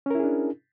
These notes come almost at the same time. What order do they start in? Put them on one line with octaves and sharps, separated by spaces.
C#4 A#4 E4 G#4 D4